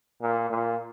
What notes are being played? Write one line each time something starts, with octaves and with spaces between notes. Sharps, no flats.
A#2
A#2